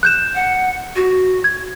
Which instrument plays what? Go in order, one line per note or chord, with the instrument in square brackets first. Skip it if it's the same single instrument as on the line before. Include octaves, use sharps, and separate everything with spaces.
[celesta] F#6 G6 E7
[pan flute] F#5
F#4
[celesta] G#6